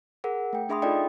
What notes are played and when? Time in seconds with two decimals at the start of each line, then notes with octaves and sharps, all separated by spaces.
0.24 G#4 A#4 F#5
0.53 A3 G5
0.69 D4 G#4 E5 B5 C6 D#6
0.82 D#4 F4 A4 D5 D#5 G5